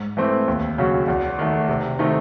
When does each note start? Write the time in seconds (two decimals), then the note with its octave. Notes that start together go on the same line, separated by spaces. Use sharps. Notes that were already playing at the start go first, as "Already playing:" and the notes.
Already playing: G#2
0.17 E3 A3 C4
0.48 D#2
0.78 C#3 F#3 C#4 F#4
1.08 E2
1.39 D#3 A3
1.68 C3
1.99 D#3 A3 C4 D#4